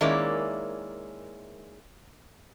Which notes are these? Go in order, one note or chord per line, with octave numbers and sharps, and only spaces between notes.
D#3 G#3 A#3 C#4 E4 D5